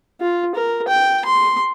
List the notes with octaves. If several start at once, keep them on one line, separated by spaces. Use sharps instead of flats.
F4
A#4
G5
C6